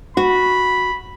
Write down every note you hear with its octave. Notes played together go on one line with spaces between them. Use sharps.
F#4 B5